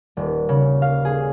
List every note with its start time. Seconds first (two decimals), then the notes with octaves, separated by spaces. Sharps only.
0.17 D#1
0.49 C#3
0.82 F5
1.05 G#4